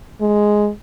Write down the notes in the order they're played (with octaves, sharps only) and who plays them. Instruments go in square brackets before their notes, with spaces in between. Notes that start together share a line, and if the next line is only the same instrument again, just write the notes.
[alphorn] G#3